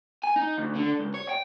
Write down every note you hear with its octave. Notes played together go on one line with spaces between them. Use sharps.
G#5
D#4
D2
D3
C#2
C#5
G5